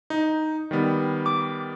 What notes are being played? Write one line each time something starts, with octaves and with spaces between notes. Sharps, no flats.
D#4
D#3 G3 B3
D6